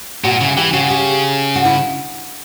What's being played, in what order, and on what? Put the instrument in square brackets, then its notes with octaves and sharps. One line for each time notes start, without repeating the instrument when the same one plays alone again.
[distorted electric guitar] A#2 [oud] F#4
[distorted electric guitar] C#3 [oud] E4
[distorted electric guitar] E3 [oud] G4
[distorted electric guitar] C#3 [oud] F#4
[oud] G4
F#4
E4